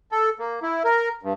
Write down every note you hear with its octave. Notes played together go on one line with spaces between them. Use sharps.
A4
A#3
E4
A#4
G2